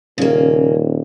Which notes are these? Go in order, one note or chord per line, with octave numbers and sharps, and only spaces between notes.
D#1 C#3 A#3